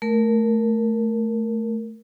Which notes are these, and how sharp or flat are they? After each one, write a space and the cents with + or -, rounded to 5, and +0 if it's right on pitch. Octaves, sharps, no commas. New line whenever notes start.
A3 +0 A#4 +0